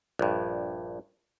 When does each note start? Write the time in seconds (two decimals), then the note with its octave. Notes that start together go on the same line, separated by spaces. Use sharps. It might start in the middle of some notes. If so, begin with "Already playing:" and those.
0.19 A#1 G2